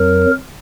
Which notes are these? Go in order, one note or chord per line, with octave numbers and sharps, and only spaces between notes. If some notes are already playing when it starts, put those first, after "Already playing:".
Already playing: F2 F#3 A#4